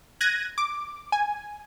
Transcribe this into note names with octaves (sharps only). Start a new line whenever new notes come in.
F#6 G#6 A#6 D#7
D6
G#5